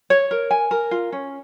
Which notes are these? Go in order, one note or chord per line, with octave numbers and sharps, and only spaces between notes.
C#5
A#4
G#5
A#4
F4
C#4